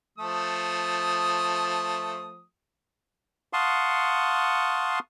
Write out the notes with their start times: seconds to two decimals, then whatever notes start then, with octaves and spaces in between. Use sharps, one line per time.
0.18 F3 A3 D#6
3.53 F5 F#5 A5 C6 C#6 D#6